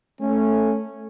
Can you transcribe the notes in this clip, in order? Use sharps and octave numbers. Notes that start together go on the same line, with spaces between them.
A3 C#4